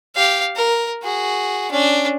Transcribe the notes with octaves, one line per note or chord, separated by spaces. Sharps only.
G4 F5
A#4
F#4 G#4
C#4 D4